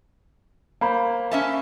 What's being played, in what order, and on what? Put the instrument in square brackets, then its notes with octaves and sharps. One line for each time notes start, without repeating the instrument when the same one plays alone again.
[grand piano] A#3 C5 B5
[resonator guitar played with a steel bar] C#4 E5 A5